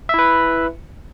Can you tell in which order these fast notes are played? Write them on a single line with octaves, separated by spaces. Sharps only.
E5 E4 B4